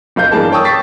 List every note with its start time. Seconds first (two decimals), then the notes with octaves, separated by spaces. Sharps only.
0.16 F#1 B1 F5 G6
0.32 G2 E3 A#3 G#4 A5
0.52 C#5 G5 A5 C#6 D#6 E6
0.64 C#6 A6 B6 C7